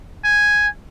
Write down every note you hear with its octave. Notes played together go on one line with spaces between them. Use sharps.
G#5